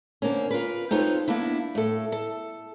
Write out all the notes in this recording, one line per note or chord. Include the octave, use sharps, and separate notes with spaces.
D3 A#3 C4 C#4
F4 A#4 B4
C4 D#4 F4 A4 B4 C#5
A#3 B3 D4 E4
A2 A4
A4